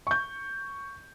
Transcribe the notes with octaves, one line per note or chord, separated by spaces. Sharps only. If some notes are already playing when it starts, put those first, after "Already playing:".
C#6 G6